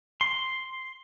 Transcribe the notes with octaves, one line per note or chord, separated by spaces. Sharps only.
C6